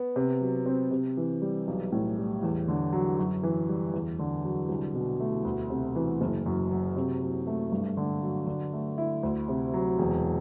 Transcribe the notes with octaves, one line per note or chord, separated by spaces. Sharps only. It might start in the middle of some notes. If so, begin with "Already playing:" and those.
Already playing: B3
C3
F#3
C4
C3
E3
G3
B1
A2
G3
E2
D3
F#3
F#2
E3
G3
E2
D3
F#3
C2
B2
A3
D2
C3
E3
F#1
F#2
F#3
C3
F#3
A3
G2
D3
F#3
D3
A3
E4
D2
C3
F#3
E1